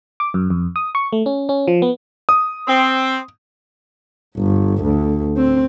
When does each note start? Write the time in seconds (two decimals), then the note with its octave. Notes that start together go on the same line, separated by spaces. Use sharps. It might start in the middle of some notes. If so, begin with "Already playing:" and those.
0.20 D6
0.34 F#2
0.50 F2
0.76 D#6
0.95 C#6
1.13 A3
1.26 C#4
1.49 C#4
1.67 F3
1.82 B3
2.29 D#6
2.68 C4
4.38 G1
4.83 D2
5.37 C4